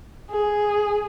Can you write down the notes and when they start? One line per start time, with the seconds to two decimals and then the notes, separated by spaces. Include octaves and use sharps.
0.31 G#4